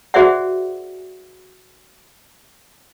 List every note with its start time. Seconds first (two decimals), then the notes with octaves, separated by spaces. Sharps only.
0.14 F#4 G#4 C5 D5 E5 F#5